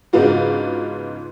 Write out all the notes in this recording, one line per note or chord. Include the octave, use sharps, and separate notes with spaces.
G#2 C#3 B3 D4 F4 F#4